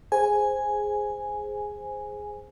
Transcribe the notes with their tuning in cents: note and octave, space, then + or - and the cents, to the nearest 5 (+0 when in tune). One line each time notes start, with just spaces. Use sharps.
G#4 +0 C5 +0 G#5 +0